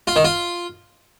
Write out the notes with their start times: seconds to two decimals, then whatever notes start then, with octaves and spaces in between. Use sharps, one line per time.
0.07 F4
0.16 D#3
0.24 F4